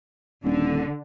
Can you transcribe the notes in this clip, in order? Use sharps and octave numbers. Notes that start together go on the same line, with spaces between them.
D#1 D3